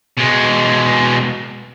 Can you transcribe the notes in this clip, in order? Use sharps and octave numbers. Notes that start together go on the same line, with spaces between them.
B2 G#3